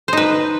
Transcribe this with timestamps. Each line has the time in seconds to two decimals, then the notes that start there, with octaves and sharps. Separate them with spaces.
0.08 C5
0.13 D#4
0.17 B4